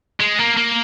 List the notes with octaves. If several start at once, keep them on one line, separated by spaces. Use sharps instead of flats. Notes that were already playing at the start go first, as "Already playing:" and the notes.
G#3
A#3
A#3